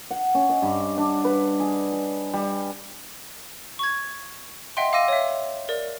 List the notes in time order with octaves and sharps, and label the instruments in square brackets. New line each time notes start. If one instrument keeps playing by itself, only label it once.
[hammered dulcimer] F#5
C#4
D#5
G2
D4
B4
G#4
G#4
G3
[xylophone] C#6 G#6
D#5 E5 F#5 G5 C6
F5 D6 E6 A#6 D#7
C#5 E5
A#4 D5